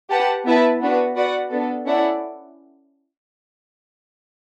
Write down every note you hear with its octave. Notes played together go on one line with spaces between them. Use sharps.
G4 B4 F#5 A5
B3 E4 B4 E5 A5
B3 D4 F#4 B4
F#4 B4 D5 F#5
B3 D4 A4
C#4 E4 A4 D5 F#5